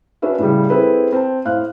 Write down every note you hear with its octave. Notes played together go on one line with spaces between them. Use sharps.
C#4 D4 F#4 B4 E5
A2 C#3 G3
C4 E4 G#4 A4 B4
C4 A5
A2 C5 F5 F#6